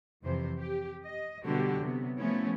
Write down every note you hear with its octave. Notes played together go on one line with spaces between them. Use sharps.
F2 C3 E3 C5
G4
D#5
B2 D3 G3 B3 F#4 G4
C3 F#3 B3
F3 F#3 A3 B3 C#4 E4